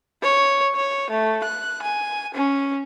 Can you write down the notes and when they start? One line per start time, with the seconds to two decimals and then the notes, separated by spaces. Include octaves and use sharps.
0.23 C#5
0.76 C#5
1.11 A3
1.44 F#6
1.82 G#5
2.35 C#4